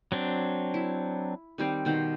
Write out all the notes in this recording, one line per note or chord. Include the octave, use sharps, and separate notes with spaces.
F#3 C4 D4
E4
D#3 G3 C4
B2 D#3 C5